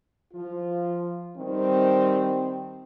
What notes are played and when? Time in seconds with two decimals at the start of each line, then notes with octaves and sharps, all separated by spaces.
0.33 F3 F4
1.38 D#3 G3 C4